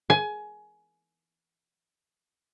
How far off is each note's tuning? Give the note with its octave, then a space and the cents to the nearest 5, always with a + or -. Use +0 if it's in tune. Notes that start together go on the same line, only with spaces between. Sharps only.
G#5 +20